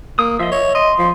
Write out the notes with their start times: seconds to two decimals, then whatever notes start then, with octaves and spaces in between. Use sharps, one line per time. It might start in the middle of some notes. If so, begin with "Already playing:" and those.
0.19 A#3 D#6
0.39 F3 D#5 E5
0.52 C#5
0.75 D#5 C6
0.98 F3